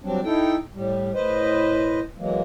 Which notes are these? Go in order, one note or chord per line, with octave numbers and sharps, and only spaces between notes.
F#3 G3 C4 D4
D#4 E4 A4 G5
A2 G3
A2 B4 C5 D#5
E3 F#3 G#3 A#3